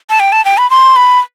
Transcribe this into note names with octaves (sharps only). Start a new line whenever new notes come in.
A5
G5
A5
G5
B5
C6
B5